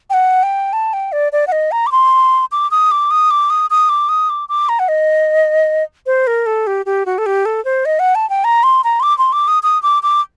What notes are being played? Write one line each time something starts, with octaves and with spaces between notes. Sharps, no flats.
G5
F#5
G5
A5
G5
D5
D5
F#5
D#5
A#5
D6
C6
D6
D#6
D6
D#6
D6
D#6
D#6
D6
D#6
D6
D6
A#5
F#5
D#5
C5
A#4
A4
G4
G4
F#4
A4
G4
A4
C5
D#5
F#5
A5
G5
A#5
C6
A#5
C6
D6
C6
D6
D#6
D#6
D6
D6